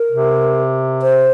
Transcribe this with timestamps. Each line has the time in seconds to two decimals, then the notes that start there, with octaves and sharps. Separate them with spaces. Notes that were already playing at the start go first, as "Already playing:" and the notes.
Already playing: A#4
0.12 C3
1.02 C5